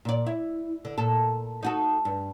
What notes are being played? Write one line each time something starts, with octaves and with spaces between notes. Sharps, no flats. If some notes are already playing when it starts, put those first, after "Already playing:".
A#2 D5
E4
D3
A#2 A4
D#4 F#4 A4
G2